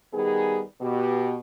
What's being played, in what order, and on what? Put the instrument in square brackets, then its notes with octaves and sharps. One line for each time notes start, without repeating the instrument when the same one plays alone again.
[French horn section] D#3 G3 B3 D#4 G#4
B2 G4